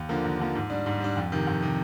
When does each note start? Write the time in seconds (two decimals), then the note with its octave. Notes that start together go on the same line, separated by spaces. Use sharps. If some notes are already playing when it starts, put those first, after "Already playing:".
Already playing: D#2
0.09 D3 F3 A#3
0.24 D#2
0.39 D3 F3 A#3
0.55 G#2
0.70 G3 D4
0.86 G#2
1.00 G3 D4
1.17 F2
1.32 C3 D#3
1.47 F2
1.62 C3 D#3